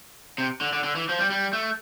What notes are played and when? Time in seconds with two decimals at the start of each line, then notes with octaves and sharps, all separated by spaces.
0.38 C3
0.61 D3
0.73 D3
0.84 D3
0.96 E3
1.09 F3
1.19 G3
1.30 G3
1.53 A3